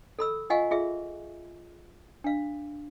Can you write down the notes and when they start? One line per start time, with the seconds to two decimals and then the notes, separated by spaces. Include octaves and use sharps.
0.19 A4 B5 E6
0.50 F4 D#5 F5 F#5 G#5 C#6
0.71 F4 G#4 E5
2.24 D4 F5